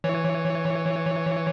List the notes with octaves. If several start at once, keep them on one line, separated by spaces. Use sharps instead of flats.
E3 C#5